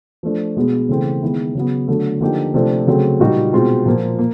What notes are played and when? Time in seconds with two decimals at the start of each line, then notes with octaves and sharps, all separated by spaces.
0.23 F3 A3 D4
0.56 B2 G#3 B3
0.89 C#3 E3 A3 C4
1.22 D#3 G#3 B3 E4
1.55 C#3 F#3 B3
1.88 D3 F#3 A3
2.21 D3 F3 A#3 D#4 G4
2.54 C3 F3 A3 D4
2.87 C#3 F#3 A3 C4
3.20 A#2 G3 A#3 D#4 F#4
3.53 B2 G#3 C4 F4
3.86 A#2 F3 A#3
4.19 A#3